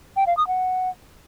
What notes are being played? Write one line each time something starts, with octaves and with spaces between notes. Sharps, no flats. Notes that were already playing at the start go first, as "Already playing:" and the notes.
G5
F5
D#6
F#5